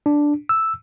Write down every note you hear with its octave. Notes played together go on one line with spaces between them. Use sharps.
D4
E6